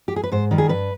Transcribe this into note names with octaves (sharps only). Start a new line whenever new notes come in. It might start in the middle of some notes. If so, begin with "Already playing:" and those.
G4
G#4
B4
G#2 C5
D#3 G3
G#4
G2 B4